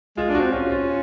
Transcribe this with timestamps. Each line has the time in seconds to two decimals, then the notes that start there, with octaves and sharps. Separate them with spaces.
0.17 G#3 F4
0.29 D4
0.35 F#4
0.41 C4
0.52 C#4 F4
0.70 F4